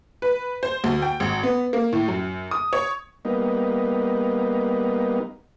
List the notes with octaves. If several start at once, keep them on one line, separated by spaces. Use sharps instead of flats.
B4
C5
D2
G5
G#1
B3
A#3
A2
F#2
D#6
C#5
G3 A#3 B3 D#4